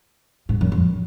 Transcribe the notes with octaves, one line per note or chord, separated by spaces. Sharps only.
G#2
F#2
F2